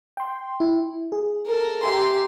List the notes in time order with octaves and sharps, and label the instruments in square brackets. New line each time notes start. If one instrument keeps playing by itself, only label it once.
[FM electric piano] G5 C6
E4
G#4
[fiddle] A4 A#4
[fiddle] G4 C6 [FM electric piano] E5 G#5 A#5